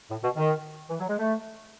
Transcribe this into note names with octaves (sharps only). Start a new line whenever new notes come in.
A2
B2
D#3
E3
F#3
G#3
A3